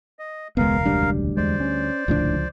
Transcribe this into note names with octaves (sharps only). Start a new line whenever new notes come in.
D#5
E1 C#2 G#3 B3 A#4 F5
D2 G3 D4
E2 G#3 C5 D5
C#4
D#1 C#2 A2 D3 F3 D4